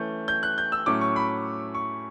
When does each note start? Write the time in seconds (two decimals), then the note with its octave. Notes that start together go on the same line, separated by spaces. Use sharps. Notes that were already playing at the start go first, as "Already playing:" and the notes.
Already playing: E3 A3 C#4 G6
0.28 G6
0.43 F#6
0.58 G6
0.72 E6
0.86 A2 F#3 A3 C#4 D6
1.01 C#6
1.16 B5
1.75 C#6